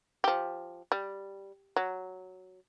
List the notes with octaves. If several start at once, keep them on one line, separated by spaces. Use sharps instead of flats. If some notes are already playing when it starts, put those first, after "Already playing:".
F3 G4
G3
F#3